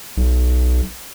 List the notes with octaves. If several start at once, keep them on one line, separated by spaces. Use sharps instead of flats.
B1